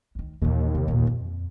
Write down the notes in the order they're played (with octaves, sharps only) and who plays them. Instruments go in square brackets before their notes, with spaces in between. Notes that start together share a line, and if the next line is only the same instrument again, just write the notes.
[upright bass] D2 D#3
[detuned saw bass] D#2 [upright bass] A#2 E3
[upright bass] C3 C4
E2 A#2
F2